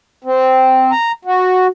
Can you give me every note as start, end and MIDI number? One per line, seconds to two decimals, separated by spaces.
0.24 0.91 60
0.92 1.12 82
1.25 1.68 66